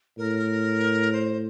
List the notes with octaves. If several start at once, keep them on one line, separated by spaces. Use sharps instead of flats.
A2 A#4
C5